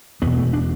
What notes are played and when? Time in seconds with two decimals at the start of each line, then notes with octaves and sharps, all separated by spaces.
0.22 E2 B3
0.26 B2
0.38 A3
0.53 D4